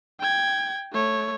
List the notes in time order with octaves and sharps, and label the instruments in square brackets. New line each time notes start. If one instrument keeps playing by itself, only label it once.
[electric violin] G5 G#6
A3 C#5